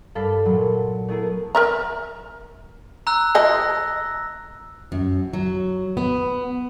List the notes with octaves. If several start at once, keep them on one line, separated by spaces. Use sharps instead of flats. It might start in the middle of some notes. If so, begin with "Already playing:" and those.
G2 A4 F5 B5 D6
A#2 F#3
A3 B3 E4 G#4 A#4
A#4 E5 A#5
A#5 E6 F#6
F3 A3 D#5 A#6
F#2
F#3
B3